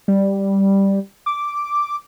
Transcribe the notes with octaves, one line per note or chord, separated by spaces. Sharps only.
G3
D6